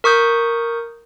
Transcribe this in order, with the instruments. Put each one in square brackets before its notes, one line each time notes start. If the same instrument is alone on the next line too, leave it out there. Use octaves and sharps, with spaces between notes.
[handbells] A#4 C#6 D#6 G6